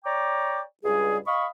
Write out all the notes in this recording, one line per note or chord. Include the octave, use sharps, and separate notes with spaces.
C#5 D5 G5 A#5 D6
C#2 G2 G3 G#4
D#5 F5 B5 C#6